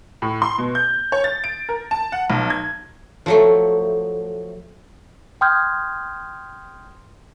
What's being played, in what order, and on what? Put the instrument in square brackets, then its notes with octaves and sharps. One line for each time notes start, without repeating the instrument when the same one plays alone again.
[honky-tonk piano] A2
C6
B2
G6
C#5
A6
D7
A#4
A5
F#5
B1
G#6
[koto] F3 F#3 A3
[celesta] G5 C6 D#6 F6 G6 G#6